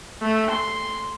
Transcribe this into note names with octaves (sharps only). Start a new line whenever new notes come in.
A3
C6